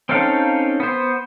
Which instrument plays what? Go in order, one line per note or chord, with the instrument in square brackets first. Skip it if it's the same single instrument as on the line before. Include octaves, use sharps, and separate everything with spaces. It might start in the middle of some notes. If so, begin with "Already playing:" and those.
[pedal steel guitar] C4 C#4 D#4 A4 F5
B3 C5